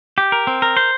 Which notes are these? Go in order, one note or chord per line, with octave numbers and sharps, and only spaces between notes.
G4
A#4
C4
A#4
C5